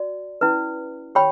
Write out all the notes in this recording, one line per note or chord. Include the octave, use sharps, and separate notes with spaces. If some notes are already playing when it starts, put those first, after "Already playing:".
Already playing: F#4 D5
C#4 E4 B4
G4 C#5 G5 B5